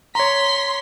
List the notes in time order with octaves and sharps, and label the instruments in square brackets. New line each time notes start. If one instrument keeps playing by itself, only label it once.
[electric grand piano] C#5 A#5 [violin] C6 B6